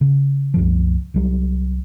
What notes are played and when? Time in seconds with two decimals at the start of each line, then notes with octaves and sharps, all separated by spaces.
0.01 C#3
0.54 C2 F#2 F3
1.14 C2 F#3 G3